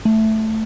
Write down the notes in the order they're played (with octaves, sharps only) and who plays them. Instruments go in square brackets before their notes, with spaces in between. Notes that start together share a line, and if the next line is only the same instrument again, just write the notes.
[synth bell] A3